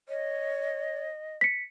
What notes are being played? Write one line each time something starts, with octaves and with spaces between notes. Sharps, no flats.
C#5 D#5
B6 C#7